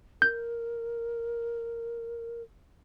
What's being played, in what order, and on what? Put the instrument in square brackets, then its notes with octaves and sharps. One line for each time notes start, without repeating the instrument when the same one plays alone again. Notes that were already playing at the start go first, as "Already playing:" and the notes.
[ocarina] A#4 [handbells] G6